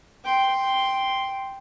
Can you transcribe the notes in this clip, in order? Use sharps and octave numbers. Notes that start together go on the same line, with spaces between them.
G5 C6